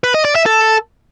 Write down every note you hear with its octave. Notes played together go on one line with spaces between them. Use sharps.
B4
D#5
D5
E5
A4